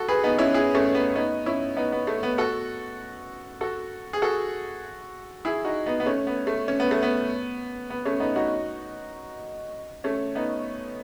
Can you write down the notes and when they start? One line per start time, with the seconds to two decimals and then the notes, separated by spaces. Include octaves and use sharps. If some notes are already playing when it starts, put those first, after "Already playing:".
Already playing: F#4 A4
0.08 G#4 B4
0.24 B3 D#4
0.38 C#4 E4
0.54 E4 G#4
0.75 A3 C#4
0.95 B3
1.16 B3 D#4
1.46 C#4 E4
1.77 B3 D#4
1.92 B3
2.07 A3
2.23 B3
2.38 F#4 A4
3.61 F#4 A4
4.13 G#4
4.22 F#4 A4
5.45 E4 G#4
5.65 D#4 F#4
5.86 B3 D#4
6.00 B3
6.06 A3 C#4
6.27 B3
6.47 A3
6.68 C#4
6.80 B3
6.91 A3
7.03 B3
7.90 B3
8.05 A3 C#4
8.20 B3 D#4
8.36 D#4 F#4
10.04 A3 C#4
10.35 B3 D#4